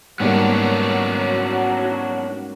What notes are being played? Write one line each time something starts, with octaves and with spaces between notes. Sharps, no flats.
G#2 F#3 G3 A#3 B3 C#4 D4 F#4